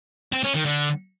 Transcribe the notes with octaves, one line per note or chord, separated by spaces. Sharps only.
C4
C#4
D#3
D3